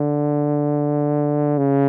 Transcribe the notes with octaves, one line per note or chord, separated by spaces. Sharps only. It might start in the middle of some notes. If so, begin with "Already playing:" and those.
Already playing: D3
C#3